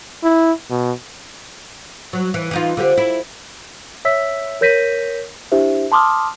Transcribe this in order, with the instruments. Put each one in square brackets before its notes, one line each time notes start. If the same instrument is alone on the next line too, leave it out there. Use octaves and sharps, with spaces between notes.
[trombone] E4
B2
[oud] F#3
E3
E3 D#4 F4
D3 C4 G4
E4
[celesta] C#5 E5 E6 B6
A#4 C#5 G6 A#6 B6 D#7
D4 E4 G4 C5 E5
A5 C6 D6 D#6 F6